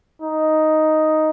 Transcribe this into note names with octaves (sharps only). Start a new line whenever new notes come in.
D#4